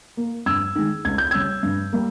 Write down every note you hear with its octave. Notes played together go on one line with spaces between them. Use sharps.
A#3
G2 E6 G#6
D#3 G#3
C#2 G#6
G6
C#3 G3 E6 G#6
G2
G3 A#3